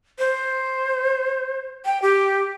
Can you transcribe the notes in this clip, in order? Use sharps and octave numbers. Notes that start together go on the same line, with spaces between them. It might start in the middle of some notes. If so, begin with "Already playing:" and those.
C5
G5
G4